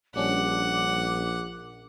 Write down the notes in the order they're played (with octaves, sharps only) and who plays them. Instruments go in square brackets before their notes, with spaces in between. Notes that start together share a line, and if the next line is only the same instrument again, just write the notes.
[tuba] A#1 [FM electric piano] G3 C#4 D4 [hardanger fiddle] F#5 [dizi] D6